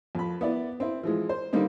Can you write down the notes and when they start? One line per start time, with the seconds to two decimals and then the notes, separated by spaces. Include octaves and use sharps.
0.15 F2 B5
0.41 B3 E4 D5
0.80 C4 E4
1.03 E3 F3 G#3
1.29 C5
1.53 D3 D#3 G3 A#3 C4 D#4